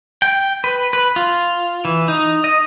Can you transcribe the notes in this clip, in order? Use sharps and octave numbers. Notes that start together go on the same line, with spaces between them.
G5
B4
B4
F4
E3
D#4
D#5